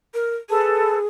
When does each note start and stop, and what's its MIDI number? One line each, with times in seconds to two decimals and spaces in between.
0.14 0.36 70
0.49 1.08 68
0.49 0.97 69
0.49 0.97 71
0.49 0.97 81